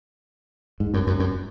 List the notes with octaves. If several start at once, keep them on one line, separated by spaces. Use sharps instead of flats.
G#2
F#2
F#2
F#2